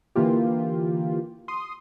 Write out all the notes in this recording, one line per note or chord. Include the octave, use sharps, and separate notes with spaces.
D3 E3 A#3 F4 G4
C6 D#6